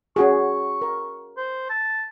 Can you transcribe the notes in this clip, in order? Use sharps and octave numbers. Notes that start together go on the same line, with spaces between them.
C#4 F#4 G#4 C#6
A#4
C5
A5